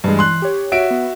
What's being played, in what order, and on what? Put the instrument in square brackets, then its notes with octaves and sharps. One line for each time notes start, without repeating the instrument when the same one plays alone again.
[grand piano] G2 G#3 [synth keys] E3
[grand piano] C6 F#6
[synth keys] G4 C#5
[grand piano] F#4 E5 D7
[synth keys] B3